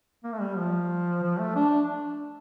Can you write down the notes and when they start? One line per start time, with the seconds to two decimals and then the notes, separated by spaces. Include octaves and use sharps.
0.24 A#3
0.32 A3
0.41 G3
0.58 F3
1.23 F3
1.39 A3
1.55 D4